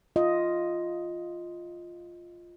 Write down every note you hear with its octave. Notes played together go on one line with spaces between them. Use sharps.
F4 D#5